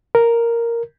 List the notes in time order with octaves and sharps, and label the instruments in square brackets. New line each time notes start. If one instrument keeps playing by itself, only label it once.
[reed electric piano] A#4